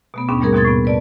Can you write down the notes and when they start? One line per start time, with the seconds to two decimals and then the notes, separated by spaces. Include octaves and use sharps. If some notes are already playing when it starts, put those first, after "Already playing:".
0.14 B2 A3 B3
0.29 D#2 G#2 B2 B3 C#4 D4
0.40 G3 A3 A#3 D#4 G#4 A#4
0.53 D#2 B2 F3 C6 G#6 A6
0.65 A2 B3
0.85 B4 D5 A5